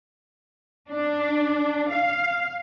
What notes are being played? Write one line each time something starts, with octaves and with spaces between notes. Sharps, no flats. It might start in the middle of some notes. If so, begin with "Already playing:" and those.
D4
F5